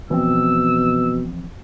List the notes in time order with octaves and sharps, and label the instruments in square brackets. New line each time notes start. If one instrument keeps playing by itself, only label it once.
[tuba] B2 [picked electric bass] E3 F3 C4 [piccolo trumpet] E6